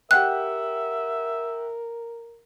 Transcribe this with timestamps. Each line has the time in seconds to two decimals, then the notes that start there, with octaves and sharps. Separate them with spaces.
0.11 G4 A#4 E5 F#5 G5 F#6